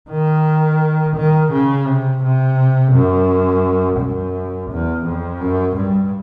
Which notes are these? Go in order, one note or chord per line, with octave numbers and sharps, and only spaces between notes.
D#3
D#3
C#3
C3
C3
F#2
F#2
E2
F2
F#2
G2